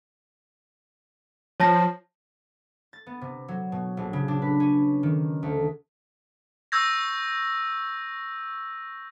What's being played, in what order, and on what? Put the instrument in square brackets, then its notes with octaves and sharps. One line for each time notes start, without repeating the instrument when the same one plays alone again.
[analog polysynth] F3 [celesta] C#5 A5 A#6
[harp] A6
B3
C3
F#3
B2
A#1
C#3
D4
B4
C#4
D#3
D2
[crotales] C#6 E6 G6 G#6 A#6